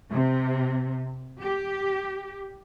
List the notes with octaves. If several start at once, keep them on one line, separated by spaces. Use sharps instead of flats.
C3
G4